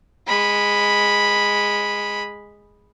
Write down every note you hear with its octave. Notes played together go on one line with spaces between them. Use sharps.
G#3 B5